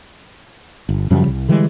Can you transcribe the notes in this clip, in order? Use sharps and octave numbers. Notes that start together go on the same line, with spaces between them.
G1
F#2 C#3 F3 G3
C2
D3 E3 G3 G#3